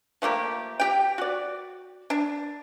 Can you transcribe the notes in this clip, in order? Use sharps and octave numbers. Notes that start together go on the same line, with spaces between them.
F3 A3 A#3 G4
G4 G5
F#4 D5
D4